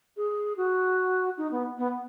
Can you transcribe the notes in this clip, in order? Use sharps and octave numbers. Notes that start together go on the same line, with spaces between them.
G#4
F#4
D#4
B3
B3